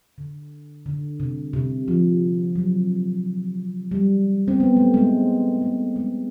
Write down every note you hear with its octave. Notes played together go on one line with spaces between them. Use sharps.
D3
D3
C3
C3
F3
F#3
G3
C4
B3
A3
G#3
A3
G#3